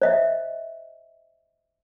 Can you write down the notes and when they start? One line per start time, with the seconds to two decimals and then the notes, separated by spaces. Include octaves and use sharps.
0.02 C5 D#5 E5